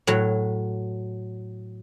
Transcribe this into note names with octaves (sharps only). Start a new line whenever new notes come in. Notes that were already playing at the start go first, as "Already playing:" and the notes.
A2 F#3